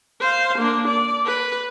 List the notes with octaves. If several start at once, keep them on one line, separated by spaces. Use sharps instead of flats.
C5 F5
A#3 D4
D5
B4